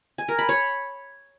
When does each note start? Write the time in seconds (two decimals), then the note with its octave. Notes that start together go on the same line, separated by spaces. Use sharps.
0.18 G#5
0.29 A#4
0.39 B5
0.49 C#5